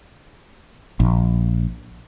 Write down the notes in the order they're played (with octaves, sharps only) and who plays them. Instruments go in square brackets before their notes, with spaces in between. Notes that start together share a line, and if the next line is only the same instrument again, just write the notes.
[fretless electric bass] A#1